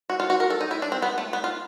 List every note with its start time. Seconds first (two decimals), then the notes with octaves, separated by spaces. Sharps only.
0.10 F#4
0.20 F4
0.30 F#4
0.40 A#4
0.50 A4
0.61 D#4
0.71 E4
0.82 D4
0.92 C4
1.02 B3
1.18 A3
1.33 B3
1.44 F4